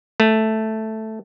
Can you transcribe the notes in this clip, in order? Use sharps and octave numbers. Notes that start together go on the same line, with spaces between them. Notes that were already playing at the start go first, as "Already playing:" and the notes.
A3